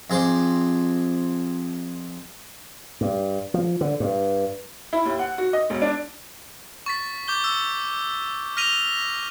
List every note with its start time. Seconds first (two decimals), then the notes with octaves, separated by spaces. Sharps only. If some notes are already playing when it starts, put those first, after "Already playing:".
0.10 F2 G#4 C5 D6
3.01 G2
3.54 F3
3.81 D3
4.00 G2
4.93 E4
5.05 D#2
5.19 F#5
5.38 F#4
5.53 D#5
5.70 E1
5.82 D4
6.86 C#6 A6 B6
7.28 D6 G6 G7
7.44 E6
8.57 F6 A#6 B6 D#7 F7 G7